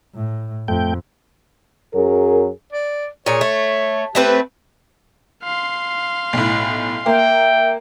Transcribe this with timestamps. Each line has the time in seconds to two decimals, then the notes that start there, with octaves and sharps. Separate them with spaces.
0.15 A2
0.68 F2 A3 G5
1.93 F#2 F#3 G#4 A#4
2.73 D5
3.26 A#2 G#4 C#5
3.41 A3
4.15 A3 C4 G4 B4
5.44 F5 C6
6.33 B1 A2
7.06 A#3 E5 G5